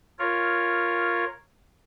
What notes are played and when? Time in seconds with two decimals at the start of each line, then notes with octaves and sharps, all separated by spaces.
0.19 F4 A#4 C#5